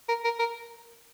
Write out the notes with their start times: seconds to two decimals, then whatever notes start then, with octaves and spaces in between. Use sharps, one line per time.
0.09 A#4
0.24 A#4
0.39 A#4